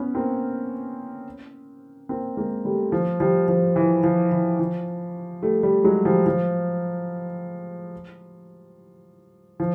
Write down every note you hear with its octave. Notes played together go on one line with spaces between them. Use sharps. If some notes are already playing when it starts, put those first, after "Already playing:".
Already playing: B3 C#4
A#3 C4
A#3 C4
G#3 A#3
G3 A3
F3
F3 G3
F3
E3
F3
E3
F3
G3 A3
G3 A3
F#3 G#3
F3 G3
F3
F3